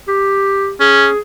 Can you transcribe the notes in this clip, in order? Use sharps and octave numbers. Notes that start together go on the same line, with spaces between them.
G4
C#4 G#4